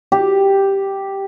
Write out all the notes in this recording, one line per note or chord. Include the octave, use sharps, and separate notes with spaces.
G4